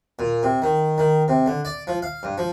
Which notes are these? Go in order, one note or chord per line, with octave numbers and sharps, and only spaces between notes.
A#2
C3
D#3
D#3
C3
D3
D5
F3
F5
G2
F3